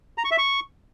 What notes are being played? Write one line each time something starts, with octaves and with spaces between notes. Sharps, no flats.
A#5
C#6
E5
C#6